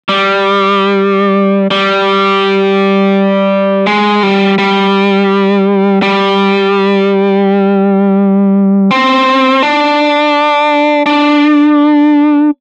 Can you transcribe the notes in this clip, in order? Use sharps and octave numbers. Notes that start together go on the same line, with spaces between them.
G3
G3
G#3
G3
G3
G3
C4
D4
D4